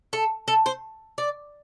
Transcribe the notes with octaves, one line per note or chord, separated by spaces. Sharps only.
A4
A4
C5
D5